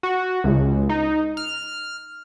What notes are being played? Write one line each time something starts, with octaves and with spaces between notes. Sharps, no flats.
F#4
C#2
D#4
F6